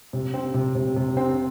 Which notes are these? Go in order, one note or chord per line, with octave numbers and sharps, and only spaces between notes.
C3
C4
C3
C3
C3
C4